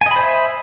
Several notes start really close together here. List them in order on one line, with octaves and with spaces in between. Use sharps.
G#5 D#5 B5 C5 E5